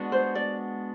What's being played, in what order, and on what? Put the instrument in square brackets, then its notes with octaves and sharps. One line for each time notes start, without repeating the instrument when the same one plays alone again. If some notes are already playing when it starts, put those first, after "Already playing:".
Already playing: [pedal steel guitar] G#3 B3 D4 F#4
[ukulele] C5
D5